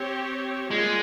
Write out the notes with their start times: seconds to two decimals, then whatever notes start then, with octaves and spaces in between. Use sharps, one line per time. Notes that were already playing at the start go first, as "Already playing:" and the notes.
Already playing: C4 G4 C#5
0.71 G3 G#3 A#3 F4